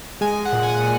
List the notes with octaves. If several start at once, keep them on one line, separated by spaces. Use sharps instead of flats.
G#3 G#5
F#5
A#2
G#5
F#5